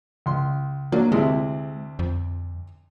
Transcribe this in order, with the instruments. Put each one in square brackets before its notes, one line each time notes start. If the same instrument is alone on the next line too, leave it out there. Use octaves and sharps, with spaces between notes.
[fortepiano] C#2 C6
[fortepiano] F#3 D4 [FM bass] A#3
[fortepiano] D2 C3 E4 [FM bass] G#3
[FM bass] F2